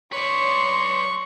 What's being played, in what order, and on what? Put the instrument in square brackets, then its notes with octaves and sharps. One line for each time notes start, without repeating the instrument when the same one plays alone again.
[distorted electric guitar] B4 D5 [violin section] C#5 [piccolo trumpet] C6 [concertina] C#6